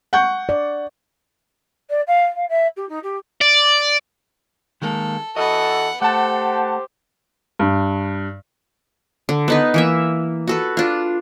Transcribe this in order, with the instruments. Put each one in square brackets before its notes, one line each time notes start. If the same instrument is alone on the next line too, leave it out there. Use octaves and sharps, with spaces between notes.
[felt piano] F#5 C#6 G6
[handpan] D5
[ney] D5
F5
F5
E5
G4
D#4
G4
[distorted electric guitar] D5
[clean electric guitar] D#3 G#3 A#3 [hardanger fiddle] A4
[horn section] E3 F#4 A4 [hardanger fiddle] B3 F#5 [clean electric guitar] D#5
[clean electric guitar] A3 [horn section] G4 C5 [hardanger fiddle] A4 [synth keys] F#5 A5
[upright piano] G2
[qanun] D3
B3 D#4 B4
E3 A#3 E5
F#4 A4 B4
D4 F4